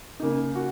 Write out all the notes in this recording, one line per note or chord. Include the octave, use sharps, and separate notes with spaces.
C#3 A#3 D#4
F#4